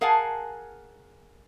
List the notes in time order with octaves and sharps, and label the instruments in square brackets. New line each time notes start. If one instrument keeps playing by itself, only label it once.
[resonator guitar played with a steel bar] G#4 A#4 F5 F#5 G#5 A5